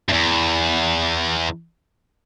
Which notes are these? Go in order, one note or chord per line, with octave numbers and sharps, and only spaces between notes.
E2 G2